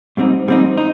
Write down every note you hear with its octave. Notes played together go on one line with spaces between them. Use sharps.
G#2 G3 C4 D#4
G#2 G3 C4 D#4
D#4